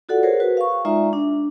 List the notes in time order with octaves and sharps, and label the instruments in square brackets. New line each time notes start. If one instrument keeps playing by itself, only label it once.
[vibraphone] F4 F#4 A4 D5 F#5
G#4 A#4 C5 C#5
F#4 B4
F5 C#6
G#3 D#4 F4 D5 E5 A#5
D4